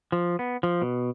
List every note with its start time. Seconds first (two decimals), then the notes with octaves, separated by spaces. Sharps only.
0.12 F3
0.39 B3
0.63 F3
0.82 B2